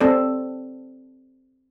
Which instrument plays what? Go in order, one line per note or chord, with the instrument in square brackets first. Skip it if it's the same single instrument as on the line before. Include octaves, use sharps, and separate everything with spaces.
[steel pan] C4 A4 D5